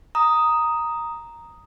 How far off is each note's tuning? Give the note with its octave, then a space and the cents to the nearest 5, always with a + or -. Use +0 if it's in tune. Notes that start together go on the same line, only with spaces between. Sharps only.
A#5 +0 D#6 +0